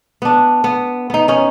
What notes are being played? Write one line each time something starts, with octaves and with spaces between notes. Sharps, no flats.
B3 D4
B3
B3 D#4
C#4 D#4